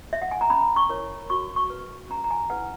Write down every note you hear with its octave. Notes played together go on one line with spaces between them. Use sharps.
E5
F#5
G#5
A#5
C#4 B5
C#6
E4 A#4 C#5
F#4 C#6
C#6
B4
C#4 A#5
A#5
G#5
E4 G#4 B4 F#5